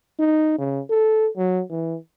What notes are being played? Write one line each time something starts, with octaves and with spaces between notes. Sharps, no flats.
D#4
C#3
A4
F#3
E3